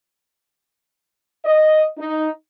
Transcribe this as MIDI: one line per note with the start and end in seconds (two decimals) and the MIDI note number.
1.45 1.85 75
1.98 2.29 63